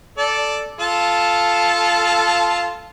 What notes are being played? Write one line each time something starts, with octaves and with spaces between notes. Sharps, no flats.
A4 D5
F4 A4 A5